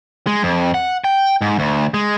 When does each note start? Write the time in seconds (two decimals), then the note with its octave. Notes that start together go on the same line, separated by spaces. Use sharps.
0.27 G#3
0.43 F2
0.74 F#5
1.04 G5
1.41 G#2
1.59 D2
1.94 G#3